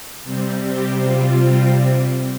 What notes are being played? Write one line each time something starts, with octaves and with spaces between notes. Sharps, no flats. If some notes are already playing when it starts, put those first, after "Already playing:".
C3 G3 C4
G4
F4